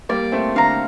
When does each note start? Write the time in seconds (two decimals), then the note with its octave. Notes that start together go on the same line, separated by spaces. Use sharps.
0.09 G3 A#3 D5
0.32 A3 C4
0.55 D3 F5 A#5